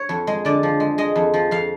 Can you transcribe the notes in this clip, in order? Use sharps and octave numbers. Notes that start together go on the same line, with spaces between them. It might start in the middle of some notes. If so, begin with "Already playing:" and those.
Already playing: C#5
F2
G#3
D3 D5
F3
G#3
G#3 D#5
F2
F3
F2 F5